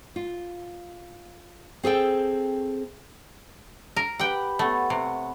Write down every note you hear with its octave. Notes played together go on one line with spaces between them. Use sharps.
F4
C4 G#4 A4 G5
A#4
G4 B4 F#5 G5
A3 B3 C#5
C3 F#5